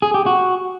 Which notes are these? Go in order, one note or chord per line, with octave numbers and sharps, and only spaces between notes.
G#4
G4
F#4